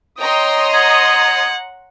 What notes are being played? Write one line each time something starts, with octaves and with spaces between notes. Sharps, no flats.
C#5 D#5 G5 A#5 C6 D#6
F#5 G#6